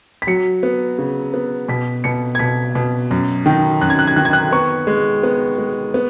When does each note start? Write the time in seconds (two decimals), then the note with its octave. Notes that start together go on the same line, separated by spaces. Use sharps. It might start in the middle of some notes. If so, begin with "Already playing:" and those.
0.22 B6
0.27 F#3 C#7
0.63 B3
0.98 C#3
1.34 B3
1.69 B2 B6
2.04 B2 C#7
2.35 G#6
2.39 B2 B6
2.75 B2
3.11 F#2
3.46 D#3
3.81 F#2 F#6
3.90 G#6
3.99 F#6
4.07 G#6
4.16 D#3 F#6
4.25 G#6
4.33 F#6
4.52 B3 C#6
4.87 G#3
5.23 B3
5.58 G#3
5.94 B3